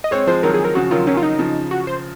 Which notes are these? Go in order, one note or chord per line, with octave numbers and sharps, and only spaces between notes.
D#5
G#3 C4 C#5
F3 G#3 C5
D#3 F#3 A#4
G#4
A#4
C#3 F3 F#4
D#3 F#3 F4
D#3 F#3 C#4
F4
D#4
C#3 F3
F#4
C5